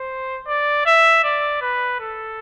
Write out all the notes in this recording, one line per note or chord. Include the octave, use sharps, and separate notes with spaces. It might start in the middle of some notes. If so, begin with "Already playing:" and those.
Already playing: C5
D5
E5
D5
B4
A4